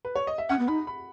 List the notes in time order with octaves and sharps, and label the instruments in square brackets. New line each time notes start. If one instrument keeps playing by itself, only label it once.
[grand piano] B4
C#5
D#5
E5
[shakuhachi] C#4 [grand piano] F#5
[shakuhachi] B3
[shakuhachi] D#4 [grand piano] B5
[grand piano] B5